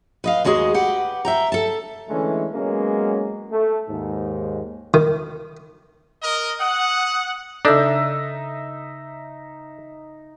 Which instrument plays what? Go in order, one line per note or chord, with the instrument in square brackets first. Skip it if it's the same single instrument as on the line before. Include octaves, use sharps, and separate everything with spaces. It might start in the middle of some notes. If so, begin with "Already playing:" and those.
[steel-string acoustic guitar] B4 D#5 F5
D#2 G#3 F#4 G#4 D#5
G4 B4 F#5
E5 G5 A#5
A4 A5
[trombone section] D3 E3 G#3 A3 C#4
F#3 G#3 A#3 B3 C#4
A3
D#2 G#2
[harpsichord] D#3
[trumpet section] A#4 D#5
[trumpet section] F#5 [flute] D#6
[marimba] C#3 A4 [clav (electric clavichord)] D4 [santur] D#4 E5